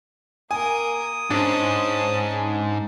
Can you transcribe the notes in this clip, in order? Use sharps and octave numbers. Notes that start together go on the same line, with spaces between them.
A#3 A#4 G#5 D#6
G#2 C#4 D4 A5